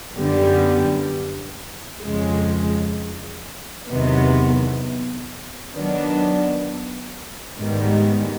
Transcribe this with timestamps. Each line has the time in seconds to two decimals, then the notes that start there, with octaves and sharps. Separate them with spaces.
0.17 F#2 D3 G3 B3
2.03 F2 C#3 F3 G#3
3.89 E2 C3 D#3 F#3 B3
5.74 D#3 F#3 B3 D4
7.59 G#2 D#3 G3 B3